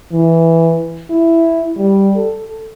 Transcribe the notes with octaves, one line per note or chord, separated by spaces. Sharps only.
E3
E4
G3
A4